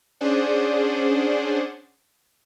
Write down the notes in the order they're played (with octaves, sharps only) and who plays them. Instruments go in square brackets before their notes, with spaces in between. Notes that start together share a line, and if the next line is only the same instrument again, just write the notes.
[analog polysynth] C#4 D4 G#4 C5 D5 F#5